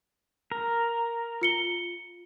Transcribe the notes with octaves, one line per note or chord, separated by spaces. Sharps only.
A#4
F4 C#7 G7